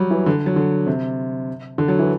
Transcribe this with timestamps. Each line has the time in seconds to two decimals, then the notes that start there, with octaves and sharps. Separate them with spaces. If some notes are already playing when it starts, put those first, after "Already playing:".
Already playing: F#3 G3
0.11 E3
0.26 D3
0.46 F#3
0.56 D3
0.86 C3
1.78 D3
1.88 F#3
1.99 E3